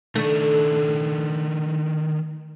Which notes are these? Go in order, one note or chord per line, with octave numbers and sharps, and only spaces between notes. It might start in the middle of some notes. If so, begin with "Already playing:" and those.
D#3 A3 D4